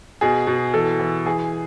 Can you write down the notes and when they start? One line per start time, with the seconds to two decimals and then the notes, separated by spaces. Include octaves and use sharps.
0.21 B2 G#4
0.47 B2
0.74 E3 A4
0.99 E3
1.26 E3 G#4